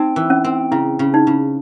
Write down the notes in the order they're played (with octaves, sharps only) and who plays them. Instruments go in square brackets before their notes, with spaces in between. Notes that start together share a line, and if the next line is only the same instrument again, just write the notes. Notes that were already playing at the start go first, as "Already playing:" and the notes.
Already playing: [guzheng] C4 [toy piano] D#4
[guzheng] E3
[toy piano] C#4
[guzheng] C4
[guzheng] C#3 [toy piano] E4
[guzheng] C#3
[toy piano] D#4
[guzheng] C#3